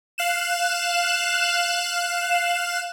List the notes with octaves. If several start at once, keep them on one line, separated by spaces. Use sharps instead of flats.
F5 F#6 E7